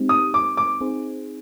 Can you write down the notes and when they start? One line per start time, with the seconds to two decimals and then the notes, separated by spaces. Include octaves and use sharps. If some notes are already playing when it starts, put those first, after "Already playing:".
Already playing: G#3 C4 D#4 G4
0.09 D#6
0.34 D6
0.57 D6
0.81 C4 D#4 G#4 C5